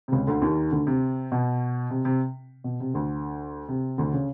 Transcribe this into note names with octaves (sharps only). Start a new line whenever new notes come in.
C3
C#2 C#3
D2 D3
D#2 D#3
D2 D3
C3
B2
C3
C3
B2
C3
D2 D3
C3
D2 D3
C#3